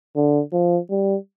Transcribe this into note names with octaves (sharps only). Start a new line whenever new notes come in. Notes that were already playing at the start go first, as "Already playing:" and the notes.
D3
F3
G3